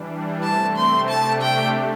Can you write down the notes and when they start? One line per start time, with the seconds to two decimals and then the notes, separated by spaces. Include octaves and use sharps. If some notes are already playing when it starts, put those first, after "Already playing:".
Already playing: E3 G3 D4
0.43 C3 A3 C4 A5
0.77 C6
1.09 C3 A3 D4 G4 A5
1.42 G5